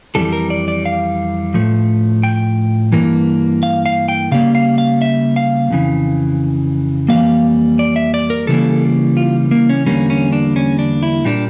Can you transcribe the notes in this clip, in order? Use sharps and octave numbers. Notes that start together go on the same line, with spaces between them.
F2 E3 G3 A4
A#4
D5
D5
F5
A2 F3 A3
G5
G2 E3 A#3
F5
F5
G5
C#3 G3 A#3 F5
F5
F5
E5
F5
F2 C#3 E3
F2 E3 G3 A#3 F5
D5
E5
D5
A#4
C#3 E3 G3 A#3 A4
F4
A#3
C#4
E2 D3 G3 A#3 C#4
C#4
D4
C#4
D4
E4
A#2 G3 A#3 D4